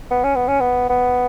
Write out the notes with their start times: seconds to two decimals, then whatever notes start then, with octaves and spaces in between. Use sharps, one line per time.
0.11 B3
0.24 C#4
0.35 B3
0.48 C#4
0.60 B3
0.89 B3